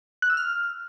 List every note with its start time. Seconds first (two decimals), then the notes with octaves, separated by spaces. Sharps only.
0.22 F#6
0.30 E6
0.37 F6